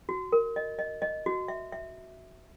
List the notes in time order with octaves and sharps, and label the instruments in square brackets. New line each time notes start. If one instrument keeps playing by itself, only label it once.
[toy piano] F#4
A#4
D#5
D#5
D#5
F#4
E5
E5